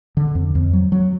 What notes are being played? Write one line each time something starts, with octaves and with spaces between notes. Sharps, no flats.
D3
F2
F2
F#3
F#3